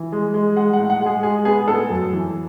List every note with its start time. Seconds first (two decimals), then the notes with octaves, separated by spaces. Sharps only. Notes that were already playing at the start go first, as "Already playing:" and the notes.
Already playing: E3
0.12 G#3
0.34 G#3
0.56 G#3 F#5
0.73 F#5
0.79 A2
0.90 F#5
1.01 G#3
1.06 G#4
1.23 G#3 G#4
1.45 B3 G#4
1.68 A2 A4
1.90 F#2
2.13 E3